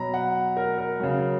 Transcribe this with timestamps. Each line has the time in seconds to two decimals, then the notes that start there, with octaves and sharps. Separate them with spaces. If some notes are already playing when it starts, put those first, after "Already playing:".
Already playing: B2 F#3 A#5 B5
0.14 F#5
0.57 A#4
0.78 A#4
1.00 C#3 F#3